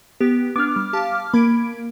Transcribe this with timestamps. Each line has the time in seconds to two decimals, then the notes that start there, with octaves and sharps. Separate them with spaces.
0.21 B3 G4
0.56 B3 D4 D6 F6
0.76 G3
0.93 G4 F5 A5
1.34 A#3 B5 G#6 D7